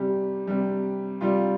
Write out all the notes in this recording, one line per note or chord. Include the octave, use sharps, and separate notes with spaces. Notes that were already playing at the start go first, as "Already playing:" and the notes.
Already playing: C3 G3 G4
C3 G3
C3 G3 F4